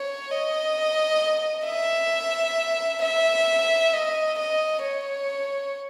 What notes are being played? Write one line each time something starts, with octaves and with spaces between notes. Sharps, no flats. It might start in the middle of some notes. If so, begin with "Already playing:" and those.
Already playing: C#5
D#5
E5
E5
D#5
D#5
C#5